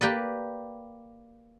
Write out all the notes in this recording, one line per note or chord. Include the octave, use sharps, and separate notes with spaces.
A#3 G4 B4 D5